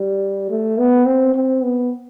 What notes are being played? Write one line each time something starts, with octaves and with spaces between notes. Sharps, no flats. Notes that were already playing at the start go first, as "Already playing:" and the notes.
Already playing: G3
A3
B3
C4
C4
B3